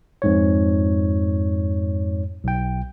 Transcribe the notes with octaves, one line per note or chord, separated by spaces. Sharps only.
F2 G#2 C#5
B1 G5